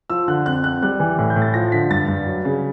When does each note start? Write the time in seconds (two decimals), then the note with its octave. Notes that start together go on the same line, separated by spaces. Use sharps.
0.10 F3 E6
0.28 D3 F#6
0.46 F2 F#6
0.64 F2 F#6
0.83 G3 F#6
1.00 E3
1.19 A2
1.30 G6
1.36 A2
1.42 A6
1.54 F3 A#6
1.72 D3 B6
1.90 G2 A6
2.08 G2
2.26 F#3
2.45 C#3